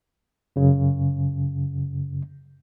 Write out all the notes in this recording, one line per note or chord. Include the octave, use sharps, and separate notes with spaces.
F#2 C#3